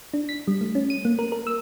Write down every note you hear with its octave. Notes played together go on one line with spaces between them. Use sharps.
D4
B6
G3
A3
C#4
D#7
A#3
A#4
A#4
E6